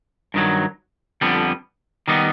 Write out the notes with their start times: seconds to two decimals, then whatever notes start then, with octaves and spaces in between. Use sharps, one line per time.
0.34 G2 D#3 F#3
1.21 F2 D3 G3 B3
2.08 D#3 G3 B3 D#4